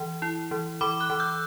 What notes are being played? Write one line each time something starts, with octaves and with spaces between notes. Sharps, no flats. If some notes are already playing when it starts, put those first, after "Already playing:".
Already playing: E3
E4
E3
E3 B5 D6
D6 F#6
E3
E6 G6